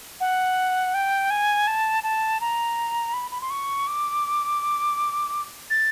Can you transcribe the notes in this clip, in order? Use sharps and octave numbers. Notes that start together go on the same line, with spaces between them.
F#5
G5
G#5
A5
A5
A#5
B5
B5
C6
C#6
D6
A6